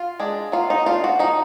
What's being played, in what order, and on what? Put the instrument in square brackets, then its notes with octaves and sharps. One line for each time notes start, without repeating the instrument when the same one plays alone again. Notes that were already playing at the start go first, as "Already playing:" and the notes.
Already playing: [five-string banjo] F4
G#3 D4
F#3 F4
D#4
D4 F4
F#4
F3 D#4